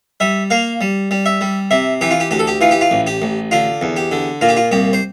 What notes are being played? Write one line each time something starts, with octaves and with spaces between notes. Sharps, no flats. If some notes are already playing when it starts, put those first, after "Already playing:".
G3 E5
A#3 F5
G3
G3
E5
G3
C3 E5
E3 G4
F4
G4
D2 G4
A4
G4
E3 F4
G4
F4
A1
G4
A1
D3 F4
E2
G4
D3
A#2 F4
G4
F4
C2 G4
C5